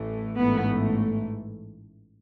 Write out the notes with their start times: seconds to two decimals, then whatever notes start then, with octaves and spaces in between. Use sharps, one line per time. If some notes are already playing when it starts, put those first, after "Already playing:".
Already playing: A1 A2 E3 A3
0.38 A1 G#2 E3 A3 B3